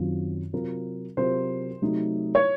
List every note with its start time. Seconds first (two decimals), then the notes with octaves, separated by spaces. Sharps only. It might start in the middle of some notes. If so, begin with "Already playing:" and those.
Already playing: F#2 D#3 F#3 C4 F4
0.53 C3 F#3 C4 F4 A#4
1.17 C3 F#3 C4 F4 A#4 C5
1.82 C3 F#3 A3 D#4
2.35 C#5